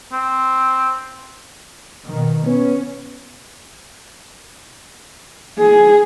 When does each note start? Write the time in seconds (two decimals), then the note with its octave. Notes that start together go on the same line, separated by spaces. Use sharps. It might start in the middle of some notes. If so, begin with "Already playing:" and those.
0.13 C4
2.08 B2 D#3
2.46 B3 C#4
5.58 G#4